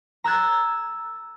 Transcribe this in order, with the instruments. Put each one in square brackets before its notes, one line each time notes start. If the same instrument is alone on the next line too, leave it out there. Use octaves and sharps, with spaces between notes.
[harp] A#5 E6 F#6 G#6 A6